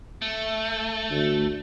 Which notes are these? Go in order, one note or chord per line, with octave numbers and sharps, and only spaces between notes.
A3
D2